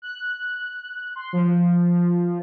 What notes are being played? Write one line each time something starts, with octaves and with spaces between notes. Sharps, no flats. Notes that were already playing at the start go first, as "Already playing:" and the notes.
F#6
C6
F3